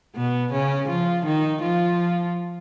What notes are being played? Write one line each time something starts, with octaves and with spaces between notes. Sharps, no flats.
B2 B3
C#3 C#4
F3 F4
D#3 D#4
F3 F4